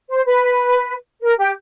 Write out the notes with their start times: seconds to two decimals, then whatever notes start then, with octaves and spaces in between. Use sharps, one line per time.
0.09 C5
0.25 B4
1.22 A#4
1.38 G4